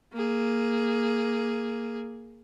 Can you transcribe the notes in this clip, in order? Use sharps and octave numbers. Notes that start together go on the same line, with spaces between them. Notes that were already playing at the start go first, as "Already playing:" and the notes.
A#3 G#4